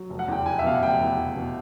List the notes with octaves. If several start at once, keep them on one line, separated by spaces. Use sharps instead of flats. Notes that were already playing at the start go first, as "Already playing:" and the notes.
Already playing: F#3
F1
F#5
E2 G5
F1 G#5
E5
B2 F5
F#5
F1 G5
E2
F1
B2